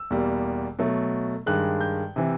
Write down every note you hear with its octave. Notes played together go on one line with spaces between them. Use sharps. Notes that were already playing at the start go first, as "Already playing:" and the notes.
Already playing: E6
E2 B2 G3 A#3
B2 F#3 A3
G2 D#3 G#3 F#6
G6
C3 E3